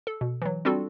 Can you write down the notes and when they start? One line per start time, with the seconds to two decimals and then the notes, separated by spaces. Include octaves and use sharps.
0.07 A4
0.21 B2
0.42 E3 F#3
0.65 G3 C4 D4 F4 F#4 A4